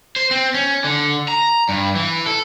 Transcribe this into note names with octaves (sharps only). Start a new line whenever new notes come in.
C5
C4
C#4
D3
A#5
G2
E3
A4